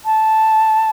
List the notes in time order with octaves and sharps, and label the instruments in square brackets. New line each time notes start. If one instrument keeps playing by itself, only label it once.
[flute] A5